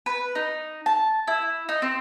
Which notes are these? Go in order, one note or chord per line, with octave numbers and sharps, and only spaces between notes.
B4
D#4
A5
E4
D#4
C4